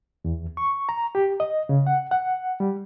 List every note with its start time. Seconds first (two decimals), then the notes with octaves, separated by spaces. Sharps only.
0.25 E2
0.57 C#6
0.89 A#5
1.15 G4
1.40 D#5
1.69 C#3
1.87 F#5
2.11 F#5
2.60 G3